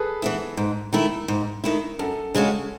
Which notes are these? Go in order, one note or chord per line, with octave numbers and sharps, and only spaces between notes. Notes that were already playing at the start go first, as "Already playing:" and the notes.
Already playing: G#4 A4 B4
E3 B3 E4
G#2
D#3 A3 E4
G#2
D#3 A3 E4
F#2 A4
C#3 G#3 C#4 F#4